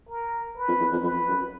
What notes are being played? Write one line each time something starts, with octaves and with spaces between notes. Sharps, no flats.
A#4
B4
F2
E2
F2
F2 B4
F#2